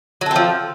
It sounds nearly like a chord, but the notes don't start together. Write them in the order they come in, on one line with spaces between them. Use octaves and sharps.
F#3 A4 C4 F3